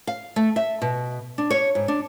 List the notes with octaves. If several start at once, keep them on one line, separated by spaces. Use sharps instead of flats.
F5
A3
E5
B2
D4
C#5
G#2
D4